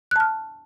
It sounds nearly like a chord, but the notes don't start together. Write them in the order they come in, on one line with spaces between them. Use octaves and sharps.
F#6 A5 F6